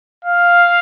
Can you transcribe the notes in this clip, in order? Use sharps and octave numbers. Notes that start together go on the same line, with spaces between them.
F5